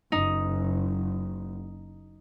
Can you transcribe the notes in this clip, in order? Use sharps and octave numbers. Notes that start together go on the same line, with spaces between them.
F#1 D#4